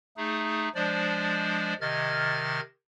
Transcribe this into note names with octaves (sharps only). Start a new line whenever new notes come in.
A3 D#4 G#4
F3 G#3 D4 C5 D5
C3 D#3 D#5 F6 G#6 A6